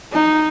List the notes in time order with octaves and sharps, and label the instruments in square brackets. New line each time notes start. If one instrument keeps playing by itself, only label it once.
[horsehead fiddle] D#4